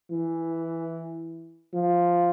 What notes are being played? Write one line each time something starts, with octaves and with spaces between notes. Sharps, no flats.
E3
F3